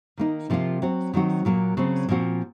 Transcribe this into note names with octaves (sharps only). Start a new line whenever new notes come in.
D#3 A#3 D#4
C3 F3 A#3 F4
F#3 C4 F#4
D#3 F#3 C4 F#4
A#2 F#3 A#3
C#3 F#3 C4
A#2 F3 C4 F#4